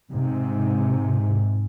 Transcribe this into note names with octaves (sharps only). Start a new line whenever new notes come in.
G#2 C3